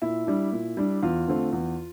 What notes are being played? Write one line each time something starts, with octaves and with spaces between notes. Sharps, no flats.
A#2 E4
G3 D4
A#2
G3 D4
E2 F4
D3 A3 C4
E2